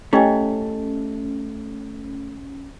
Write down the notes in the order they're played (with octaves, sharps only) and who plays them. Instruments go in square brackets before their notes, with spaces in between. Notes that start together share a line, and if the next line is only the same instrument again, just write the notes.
[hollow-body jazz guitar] A3 [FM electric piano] C#4 [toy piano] E4 G4 D#5 [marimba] C#5 G5 G#5